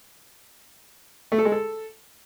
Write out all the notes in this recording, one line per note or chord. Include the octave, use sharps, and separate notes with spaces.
A3
A4
G#3
A4